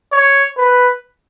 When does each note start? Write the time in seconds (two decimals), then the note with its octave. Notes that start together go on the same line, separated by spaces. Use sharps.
0.12 C#5
0.57 B4